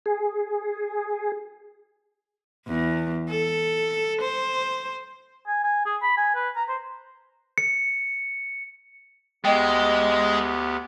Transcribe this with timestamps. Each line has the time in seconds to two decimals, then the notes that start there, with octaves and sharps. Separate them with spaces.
0.06 G#4
2.67 E2
3.29 A4
4.22 C5
5.47 G#5
5.64 G#5
5.86 G#4
6.02 B5
6.17 G#5
6.35 B4
6.56 A#5
6.69 C5
7.58 C#7
9.45 D2 G#3 B3 G4 D#5 G5